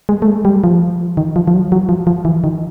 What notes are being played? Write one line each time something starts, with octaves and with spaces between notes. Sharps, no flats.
G#3
A3
G#3
G3
F3
D#3
F3
F3
F#3
F#3
F3
F3
E3
D#3